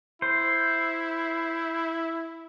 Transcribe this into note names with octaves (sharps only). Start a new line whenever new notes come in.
E4 C5